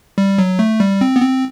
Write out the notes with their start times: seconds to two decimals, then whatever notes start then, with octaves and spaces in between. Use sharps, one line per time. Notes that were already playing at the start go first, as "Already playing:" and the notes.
0.18 G3
0.38 F#3
0.59 A3
0.80 G3
1.01 C4
1.16 B3
1.22 C4